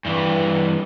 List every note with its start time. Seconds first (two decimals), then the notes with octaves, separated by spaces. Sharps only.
0.05 G2 E3